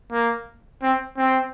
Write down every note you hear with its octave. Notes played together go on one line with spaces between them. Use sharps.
A#3
C4
C4